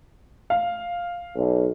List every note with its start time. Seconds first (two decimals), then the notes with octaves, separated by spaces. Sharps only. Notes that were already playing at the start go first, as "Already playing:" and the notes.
0.50 F5
1.36 B1